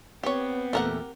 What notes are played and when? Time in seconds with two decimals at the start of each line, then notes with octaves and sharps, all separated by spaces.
0.23 B3 C4 G4 C#5
0.73 E2 A#2 A3 G4 A#4 F#5